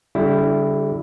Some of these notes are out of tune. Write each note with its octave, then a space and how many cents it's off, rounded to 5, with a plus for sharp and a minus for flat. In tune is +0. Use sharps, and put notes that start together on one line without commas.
D3 -45 G3 +0 E4 +0